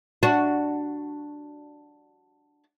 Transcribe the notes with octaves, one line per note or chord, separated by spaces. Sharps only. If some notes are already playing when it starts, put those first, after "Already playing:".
D4 F#4